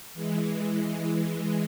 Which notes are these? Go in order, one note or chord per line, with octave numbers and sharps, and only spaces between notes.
E3 G#3